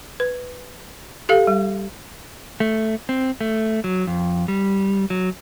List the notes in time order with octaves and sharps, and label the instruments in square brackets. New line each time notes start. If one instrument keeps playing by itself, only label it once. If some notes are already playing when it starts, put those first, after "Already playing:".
[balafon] B4
G4 A4 F5
G3
[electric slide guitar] A3
C4
A3
F#3
F2
G3
F#3